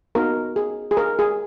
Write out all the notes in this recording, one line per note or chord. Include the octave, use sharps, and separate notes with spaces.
B3 D#4 F#4 A#4
G#4
G#4
A#4
G#4